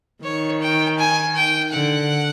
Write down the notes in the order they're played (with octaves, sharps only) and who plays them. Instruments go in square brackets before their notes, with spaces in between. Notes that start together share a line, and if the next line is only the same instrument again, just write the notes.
[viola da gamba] D#3 [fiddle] C#5
[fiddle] G5
G#5
G5
[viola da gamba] D3 [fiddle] F#5